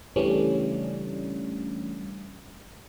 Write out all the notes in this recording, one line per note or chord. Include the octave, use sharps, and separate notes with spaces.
C#3 E3 G3 A3 C#4 D4